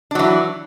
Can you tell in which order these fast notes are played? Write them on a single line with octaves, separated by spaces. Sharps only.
D4 F#3 E3